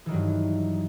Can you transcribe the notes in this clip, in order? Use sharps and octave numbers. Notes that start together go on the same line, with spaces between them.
G2 D#3 E3 F#3